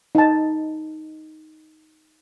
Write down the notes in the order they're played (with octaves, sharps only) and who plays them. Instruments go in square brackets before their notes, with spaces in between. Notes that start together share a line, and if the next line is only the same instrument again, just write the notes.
[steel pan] D#4 A5